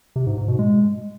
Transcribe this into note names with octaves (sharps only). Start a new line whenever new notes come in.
C3
G#2
G#2
B2
G#3